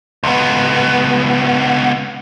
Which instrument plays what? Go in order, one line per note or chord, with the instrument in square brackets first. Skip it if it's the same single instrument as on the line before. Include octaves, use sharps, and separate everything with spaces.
[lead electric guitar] C#2 B3